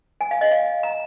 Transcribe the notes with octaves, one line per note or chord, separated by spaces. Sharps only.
G#5
F5
D#5
F5
A#5